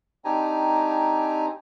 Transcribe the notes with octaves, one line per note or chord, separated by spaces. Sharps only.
C4 D4 D#4 G4 G#5 A#5